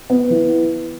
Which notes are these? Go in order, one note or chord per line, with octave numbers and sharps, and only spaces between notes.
B3
E3